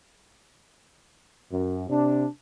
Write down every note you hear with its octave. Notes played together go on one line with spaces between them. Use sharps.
F#2
C3 D4